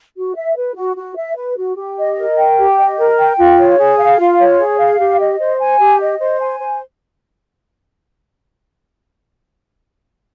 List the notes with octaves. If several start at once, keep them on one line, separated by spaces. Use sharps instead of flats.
F#4
E5
B4
F#4
F#4
E5
B4
F#4
G4
D#5
A#4
G5
G4
D#5
A#4
G5
F4
C#5
G#4
F5
F4
C#5
G#4
F5
G4
D#5
C5
G#5
G4
D#5
C5
G#5
C5